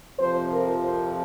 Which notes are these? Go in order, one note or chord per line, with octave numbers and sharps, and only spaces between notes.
F2 C3 F3 C5
A#4
C5